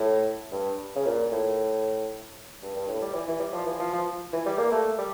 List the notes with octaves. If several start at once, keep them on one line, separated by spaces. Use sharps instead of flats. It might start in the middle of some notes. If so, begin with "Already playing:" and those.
Already playing: A2
G2
C#3
A#2
A2
G2
G2
A2
G3
E3
E3
G3
F3
E3
F3
F3
E3
G3
A#3
A3
G3